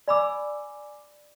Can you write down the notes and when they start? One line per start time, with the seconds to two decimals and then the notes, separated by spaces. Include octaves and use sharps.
0.08 D5 G#5 B5 D6 E6